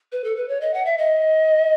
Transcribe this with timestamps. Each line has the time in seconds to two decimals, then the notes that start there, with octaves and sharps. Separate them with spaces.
0.12 B4
0.24 A4
0.36 B4
0.49 C#5
0.61 D#5
0.74 F#5
0.85 E5
0.98 D#5